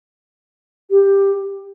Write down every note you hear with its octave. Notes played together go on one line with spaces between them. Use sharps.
G4